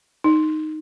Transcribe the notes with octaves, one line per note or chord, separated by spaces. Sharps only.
D#4